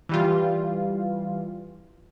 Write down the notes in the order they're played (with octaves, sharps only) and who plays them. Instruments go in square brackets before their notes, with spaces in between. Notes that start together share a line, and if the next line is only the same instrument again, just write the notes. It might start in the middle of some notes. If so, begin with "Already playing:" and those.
[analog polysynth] E3 G3 F4